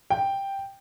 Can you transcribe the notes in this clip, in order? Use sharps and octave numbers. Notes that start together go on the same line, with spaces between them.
G5